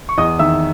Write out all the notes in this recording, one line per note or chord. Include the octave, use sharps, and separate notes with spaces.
C#6
E2 D#5 D#6
D#3 E5 E6